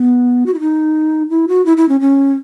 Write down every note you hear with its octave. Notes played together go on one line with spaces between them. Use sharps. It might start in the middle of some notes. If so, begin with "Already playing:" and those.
Already playing: B3
F#4
E4
D#4
E4
F#4
E4
E4
C#4
C#4